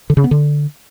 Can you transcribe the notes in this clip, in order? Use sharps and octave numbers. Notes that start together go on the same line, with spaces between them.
D3
C#3
B3
D3